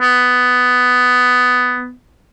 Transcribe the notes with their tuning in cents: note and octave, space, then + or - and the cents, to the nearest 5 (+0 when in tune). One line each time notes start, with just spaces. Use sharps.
B3 +10